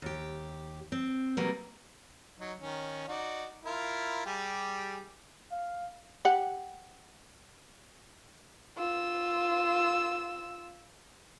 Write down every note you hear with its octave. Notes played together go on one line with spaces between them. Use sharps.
D#2 G4
C4
C3 F#3 G3 A3 A#3 B4
F#3 D#4
D#3 C#4
D#4 F#4 D5
E4 F4 A#4
G3 G4 G#4
F5
G4 F#5
F4 E6